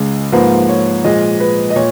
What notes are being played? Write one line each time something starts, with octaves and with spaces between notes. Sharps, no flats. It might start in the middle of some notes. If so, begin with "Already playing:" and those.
Already playing: C#2 C#3 G#3
G#2 F3 A#3 B4
C#5
A#2 F3 G#3 D#5
B4
D#5
A#2 C#5